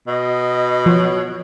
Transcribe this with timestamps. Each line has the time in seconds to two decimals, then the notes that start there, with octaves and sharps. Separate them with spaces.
0.07 B2 D#5
0.86 F3 C#5